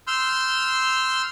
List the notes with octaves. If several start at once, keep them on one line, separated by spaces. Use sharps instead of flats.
C6 E6 F6 G6